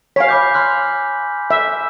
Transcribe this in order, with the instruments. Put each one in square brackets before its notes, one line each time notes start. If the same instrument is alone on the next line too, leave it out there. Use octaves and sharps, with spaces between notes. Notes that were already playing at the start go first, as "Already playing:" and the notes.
[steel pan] C#5 F5 [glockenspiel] G#5 B6
[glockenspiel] B5 D6 G6
C6 F6 F#6
[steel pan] E5